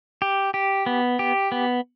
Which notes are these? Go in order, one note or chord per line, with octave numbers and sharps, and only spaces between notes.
G4
G4
B3
G4
B3